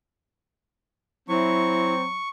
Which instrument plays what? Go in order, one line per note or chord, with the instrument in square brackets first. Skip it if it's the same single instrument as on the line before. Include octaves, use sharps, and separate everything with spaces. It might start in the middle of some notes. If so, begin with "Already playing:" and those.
[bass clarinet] F#3 [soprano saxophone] C4 [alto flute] E4 [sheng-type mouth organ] C#6